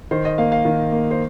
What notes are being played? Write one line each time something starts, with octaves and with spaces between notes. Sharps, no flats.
D#3 C5
D#5
A#3 F5
F5
D#3
A#3
C5